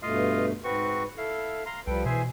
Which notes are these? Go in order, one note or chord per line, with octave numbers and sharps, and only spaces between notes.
G2 B2 A3 F4 D#5 F5
G#2 C4 F#4 B4 C#6
E4 A4 F5
F5 A#5 C6
C2 F3 G3 A4 B4 G5
B2 E3 G#4 C5 E5 G#5